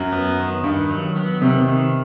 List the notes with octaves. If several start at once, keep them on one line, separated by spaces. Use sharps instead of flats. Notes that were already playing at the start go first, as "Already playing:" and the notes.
Already playing: F#2 F#3
B3
D#3
G2 D#3
F#3
B3
C3 D#3
D#3